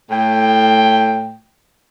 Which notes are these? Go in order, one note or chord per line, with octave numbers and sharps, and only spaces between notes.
A2 G5